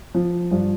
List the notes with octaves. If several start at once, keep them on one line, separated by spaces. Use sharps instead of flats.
F3
G2 F3